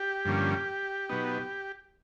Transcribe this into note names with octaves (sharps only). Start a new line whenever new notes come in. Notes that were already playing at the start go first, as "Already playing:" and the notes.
Already playing: G4
G2 D3 F3 A#3 C#4
B2 F#3 B3 D#4